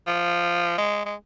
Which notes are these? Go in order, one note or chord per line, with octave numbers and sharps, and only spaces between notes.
F3
G#3
G#3